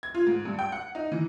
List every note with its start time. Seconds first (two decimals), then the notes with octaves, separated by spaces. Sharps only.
0.03 G#6
0.15 F4
0.27 G#2
0.45 G2
0.59 G5
0.72 F#5
0.95 D#4
1.12 E3